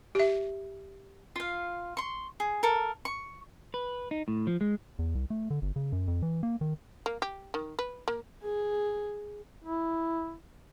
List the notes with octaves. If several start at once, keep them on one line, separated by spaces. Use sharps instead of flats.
G4 E5
F4 F5
C6 C#6
G#4
A4 A#4
C#6
B4
D#4
A2
F3
G#3
E2
C2
A3
D3
G1
C#3
F#2
F2
E3
A#3
D#3
A#3
G4
D#3
B4
A#3
G#4
E4